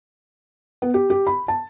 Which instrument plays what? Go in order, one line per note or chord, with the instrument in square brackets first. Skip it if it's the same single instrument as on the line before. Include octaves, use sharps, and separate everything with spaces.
[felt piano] B3
G4
G4
B5
A5